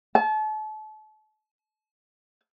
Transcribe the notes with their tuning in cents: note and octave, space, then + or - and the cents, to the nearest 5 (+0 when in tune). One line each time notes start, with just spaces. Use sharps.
A5 -35